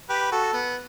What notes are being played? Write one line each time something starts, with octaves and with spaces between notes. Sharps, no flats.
G4 B4
F#4 A4
B3